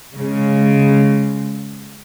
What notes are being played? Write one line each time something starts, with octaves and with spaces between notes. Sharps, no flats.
C#3 G#3